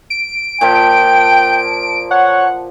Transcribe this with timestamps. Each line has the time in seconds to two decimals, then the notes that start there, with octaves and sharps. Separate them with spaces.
0.10 D7
0.61 A#2 F3 G5
2.11 C#5 F#5